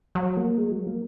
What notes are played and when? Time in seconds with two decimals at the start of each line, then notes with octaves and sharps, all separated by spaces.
0.15 F#3
0.37 A#3
0.58 G#3
0.71 F#3
0.87 A#3